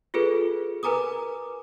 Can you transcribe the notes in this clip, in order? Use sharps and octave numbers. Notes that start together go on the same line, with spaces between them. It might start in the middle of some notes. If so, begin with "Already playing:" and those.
F4 G#4 A4 B4
A#4 B4 G#5 A#5 D6 D#6